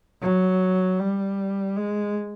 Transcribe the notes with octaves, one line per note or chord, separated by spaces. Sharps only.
F#3
G3
G#3